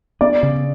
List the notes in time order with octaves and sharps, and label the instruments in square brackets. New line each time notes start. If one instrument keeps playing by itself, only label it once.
[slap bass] B3 [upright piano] D5
[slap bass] C#3